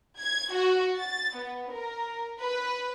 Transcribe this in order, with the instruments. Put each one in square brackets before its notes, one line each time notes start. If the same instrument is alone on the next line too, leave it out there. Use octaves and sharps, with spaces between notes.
[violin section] G#6
F#4
A6
B3
A#4
B4